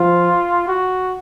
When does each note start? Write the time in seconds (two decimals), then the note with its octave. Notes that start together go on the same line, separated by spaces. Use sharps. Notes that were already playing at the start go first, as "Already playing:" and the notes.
Already playing: F3 F4
0.68 F#4